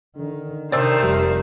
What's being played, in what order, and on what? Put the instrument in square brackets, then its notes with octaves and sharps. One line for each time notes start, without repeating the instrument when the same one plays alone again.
[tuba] D3 [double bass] D#3
[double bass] C3 [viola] D#3 C5 [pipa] A3 C4 D5
[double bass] F1 [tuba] G3